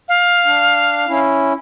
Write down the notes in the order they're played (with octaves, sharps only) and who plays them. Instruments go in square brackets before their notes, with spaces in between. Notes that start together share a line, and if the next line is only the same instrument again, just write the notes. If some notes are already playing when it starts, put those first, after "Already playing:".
[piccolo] F5
[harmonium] D4
C#4 E4